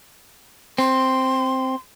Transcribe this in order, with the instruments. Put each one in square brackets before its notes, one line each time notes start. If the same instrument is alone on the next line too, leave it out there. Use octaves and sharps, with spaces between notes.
[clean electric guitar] C4 [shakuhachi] C6